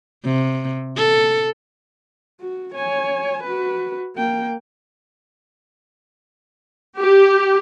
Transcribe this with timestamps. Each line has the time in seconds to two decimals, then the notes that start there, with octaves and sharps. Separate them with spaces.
0.25 C3
0.97 A4
2.40 F#4
2.74 C#5 G#5
3.43 F#4 B4
4.16 A#3 G5
6.98 G4